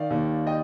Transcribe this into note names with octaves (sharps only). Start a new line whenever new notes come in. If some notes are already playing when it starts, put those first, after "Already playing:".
Already playing: D#3 D5 F5
D#2
D#5 G5